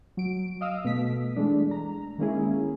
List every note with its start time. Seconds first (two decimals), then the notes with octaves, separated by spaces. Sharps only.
0.17 F#3 D7
0.61 D#5 F5 D#6 E6
0.85 B2 A3 B6
1.36 E3 G#3 A3 D4
1.71 A#5
2.18 D#3 G#3 A#3 C#4 E4 G#4